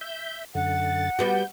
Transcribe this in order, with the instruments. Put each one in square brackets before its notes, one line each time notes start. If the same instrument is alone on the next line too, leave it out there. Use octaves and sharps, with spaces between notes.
[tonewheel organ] E5 G6
[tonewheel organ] F#2 D3 A6 [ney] F#5
[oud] G3 B3 F#4 [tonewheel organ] G6